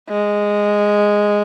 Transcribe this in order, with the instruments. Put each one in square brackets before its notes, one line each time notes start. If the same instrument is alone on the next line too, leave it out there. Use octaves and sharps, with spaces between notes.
[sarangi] G#3